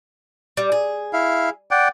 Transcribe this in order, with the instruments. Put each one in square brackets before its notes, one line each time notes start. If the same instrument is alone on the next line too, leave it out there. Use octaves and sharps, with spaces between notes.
[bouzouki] G3
G#4
[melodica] E4 F5
D5 F#5 G5